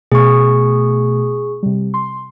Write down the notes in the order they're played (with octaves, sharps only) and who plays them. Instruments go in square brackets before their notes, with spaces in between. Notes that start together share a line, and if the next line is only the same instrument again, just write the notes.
[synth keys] B2 A3 [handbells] G#4 C#6
[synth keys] C3 G3
C6